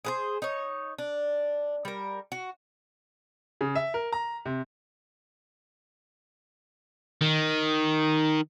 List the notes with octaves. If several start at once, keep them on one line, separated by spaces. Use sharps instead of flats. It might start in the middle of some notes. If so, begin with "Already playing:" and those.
G#4 B4 C5
D#4 C#5
D4
G3 A#4
F#4
C#3
E5
A#4
A#5
C3
D#3